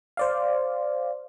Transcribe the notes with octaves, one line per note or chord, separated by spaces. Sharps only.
C5 D5 F5